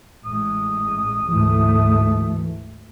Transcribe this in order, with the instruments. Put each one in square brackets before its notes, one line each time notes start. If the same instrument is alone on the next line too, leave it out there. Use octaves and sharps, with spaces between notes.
[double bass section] A1 G#3 [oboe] D#6
[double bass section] D2 G#2 A3 [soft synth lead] E3